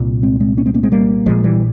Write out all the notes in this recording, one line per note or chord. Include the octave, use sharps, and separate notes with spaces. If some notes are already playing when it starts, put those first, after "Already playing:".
Already playing: C2 A#2
G#3 C4
G#3 C4
A#3 C#4
G#3 C4
A#3 C#4
G#3 C4
G3 A#3
A#1 A#2 F3 G#3
E3 G3